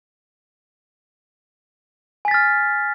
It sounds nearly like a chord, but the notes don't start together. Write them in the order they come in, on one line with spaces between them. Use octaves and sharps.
G#5 B6 A6 F6